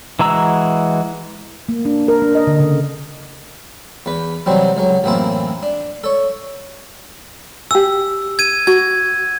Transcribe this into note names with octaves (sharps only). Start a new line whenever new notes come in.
E3 G#3 F#4 A#5 E6
A#3
D4
A#4
D4
D#5
D3
C#3
E2 B4
C3 E3 F#3 G3 C4
C#2 F#3
A1 F#2 A#3 C4 E4 A5
D4
A4 C#5
G4 G#5 E6
G#6 D#7
F#4 G#6